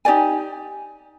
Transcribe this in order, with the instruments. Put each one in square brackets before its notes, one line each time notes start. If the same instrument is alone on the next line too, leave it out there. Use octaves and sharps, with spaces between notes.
[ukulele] D#4 G4 D5 G#5